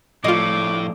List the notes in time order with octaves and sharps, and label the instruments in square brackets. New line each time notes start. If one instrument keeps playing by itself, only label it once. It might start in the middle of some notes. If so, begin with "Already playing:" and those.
[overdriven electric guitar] A2 [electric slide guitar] F3 A3 D4 [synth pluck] F4 D#5 [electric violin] D6